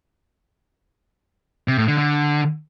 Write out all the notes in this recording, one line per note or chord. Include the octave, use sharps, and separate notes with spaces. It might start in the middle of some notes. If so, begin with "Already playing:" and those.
C3
A2
D3
D3